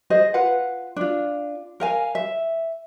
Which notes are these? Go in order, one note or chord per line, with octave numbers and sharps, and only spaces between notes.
G#4 C5 D#5
F4 B4 F#5
D4 F4
A#4 F5 G#5
E5